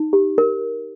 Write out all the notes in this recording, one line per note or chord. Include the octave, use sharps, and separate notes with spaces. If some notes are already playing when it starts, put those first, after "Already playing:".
Already playing: D#4
G4
A#4